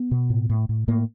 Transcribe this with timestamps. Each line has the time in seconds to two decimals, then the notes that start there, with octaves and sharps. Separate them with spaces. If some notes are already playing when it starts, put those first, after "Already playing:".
Already playing: B3
0.11 B2
0.30 A2
0.49 A2
0.69 A2
0.88 A2 A#3